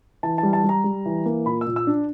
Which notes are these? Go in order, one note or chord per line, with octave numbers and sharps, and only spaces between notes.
E3 A5
A5
G3
A5
G3
A#5
G3
E3
A#3
A#2 B5
E6
A#2
E6
D4